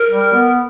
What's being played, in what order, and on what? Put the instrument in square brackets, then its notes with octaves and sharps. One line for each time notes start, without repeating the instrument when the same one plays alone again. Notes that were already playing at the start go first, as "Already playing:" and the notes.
Already playing: [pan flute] A#4
[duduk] G3
B3